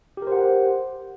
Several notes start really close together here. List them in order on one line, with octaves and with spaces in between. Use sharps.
G4 A#4 C5 F#5